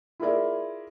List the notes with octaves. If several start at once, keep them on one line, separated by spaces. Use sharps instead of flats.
E4 F4 G#4 A#4 D5 E5